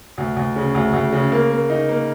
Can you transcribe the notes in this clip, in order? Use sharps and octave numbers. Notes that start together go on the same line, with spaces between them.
D2
D2
C#3
D2
D2
C#3
A#3
A#3
D#4
A#3